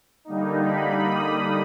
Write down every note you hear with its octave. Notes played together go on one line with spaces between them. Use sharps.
D3 G3 A#3 D#4
B5
D#6